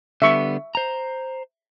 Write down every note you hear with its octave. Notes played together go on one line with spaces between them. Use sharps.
D3 G3 B3 E5 C#6
C5 A#5